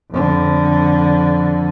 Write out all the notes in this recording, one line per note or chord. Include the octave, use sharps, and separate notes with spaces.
F2 D3